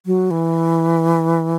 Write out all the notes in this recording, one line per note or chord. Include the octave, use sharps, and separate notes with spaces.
F#3
E3